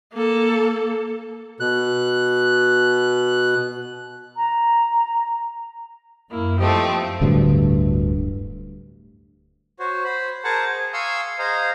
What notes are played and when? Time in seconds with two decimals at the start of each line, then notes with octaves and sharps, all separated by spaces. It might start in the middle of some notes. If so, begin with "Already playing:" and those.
0.14 A#3 A4
1.60 B2 F#6
4.37 A#5
6.30 F#2 A#3 E4
6.59 F3 A3 C4 G4 D#5
7.21 D1 D2 G2
9.79 F#4 C5 C#5
10.04 C5 B5
10.44 G#4 A#4 C5 F#5 A5 A#5
10.67 G#4
10.93 F5 G#5 C6 C#6 D#6 E6
11.39 G#4 C5 D#5 F5 A#5